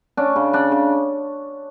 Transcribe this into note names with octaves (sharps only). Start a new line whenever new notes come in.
C#4 D4
C#3
C#3 D4
C#3